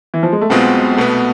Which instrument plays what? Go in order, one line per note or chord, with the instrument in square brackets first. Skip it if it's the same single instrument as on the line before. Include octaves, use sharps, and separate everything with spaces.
[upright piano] E3
F3
G#3
A3
[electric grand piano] B1 B2 G#3 C4 F4 [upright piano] B3
[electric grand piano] C2 B2 B3 [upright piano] A3